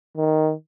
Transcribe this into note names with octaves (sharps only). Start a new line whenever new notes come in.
D#3